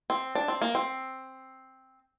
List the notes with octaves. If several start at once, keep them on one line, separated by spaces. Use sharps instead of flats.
C4
D4
C4
A#3
C4